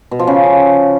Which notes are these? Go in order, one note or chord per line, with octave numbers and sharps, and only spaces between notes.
B2
F3
C#3